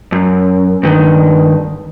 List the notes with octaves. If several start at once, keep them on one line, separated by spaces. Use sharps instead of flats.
F#2
G2 D#3